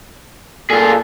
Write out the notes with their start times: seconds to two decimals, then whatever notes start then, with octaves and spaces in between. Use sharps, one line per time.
0.70 A#2 F4 G#4 A4